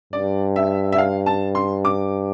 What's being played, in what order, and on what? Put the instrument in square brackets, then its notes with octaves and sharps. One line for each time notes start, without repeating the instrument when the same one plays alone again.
[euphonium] G2 [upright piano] D5
[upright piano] E5
E5
F5
A5
C6
D6